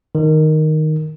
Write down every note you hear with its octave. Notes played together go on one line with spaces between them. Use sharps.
D#3